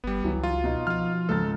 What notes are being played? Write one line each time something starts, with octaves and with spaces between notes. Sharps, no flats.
G1 G3 B3
C#2 E3 F#3
F4
B2 D#4
F3 F4 F6
C#2 G#2 A4 A6